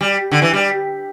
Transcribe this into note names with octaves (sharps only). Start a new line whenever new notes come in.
G3
D3
E3
G3